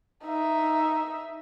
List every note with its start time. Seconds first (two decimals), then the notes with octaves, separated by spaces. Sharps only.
0.25 D#4 E5